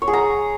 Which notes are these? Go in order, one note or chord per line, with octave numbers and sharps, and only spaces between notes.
C#5
G#4
A#5